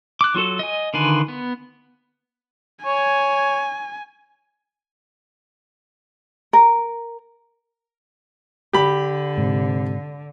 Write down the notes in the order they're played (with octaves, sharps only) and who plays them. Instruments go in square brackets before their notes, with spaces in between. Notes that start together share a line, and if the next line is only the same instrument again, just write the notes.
[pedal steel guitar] D6 F#6
F#3 F4 F#4 A4
D#5 G#5
D3 D#3 F4 B4 G#5
B3
[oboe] C#5 [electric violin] G#5
[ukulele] A#4
[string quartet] D3 [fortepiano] G4 B5
[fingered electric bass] G#2 [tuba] C3